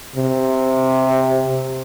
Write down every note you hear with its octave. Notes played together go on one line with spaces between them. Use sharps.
C3